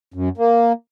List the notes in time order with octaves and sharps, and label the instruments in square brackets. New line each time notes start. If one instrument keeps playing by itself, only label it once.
[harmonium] F#2
A#3